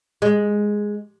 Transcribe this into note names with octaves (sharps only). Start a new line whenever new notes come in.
G#3